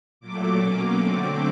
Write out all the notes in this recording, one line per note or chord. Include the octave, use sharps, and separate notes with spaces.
A#2 F#3 A3 D6
B2 F#3 A#3 C#4
D3 F#3 A3 C4